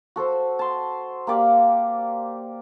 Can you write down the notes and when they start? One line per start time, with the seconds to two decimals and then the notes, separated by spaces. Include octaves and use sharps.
0.16 F#4 A4 C5
0.59 A5 C6
1.27 A#3 G4 D5 F5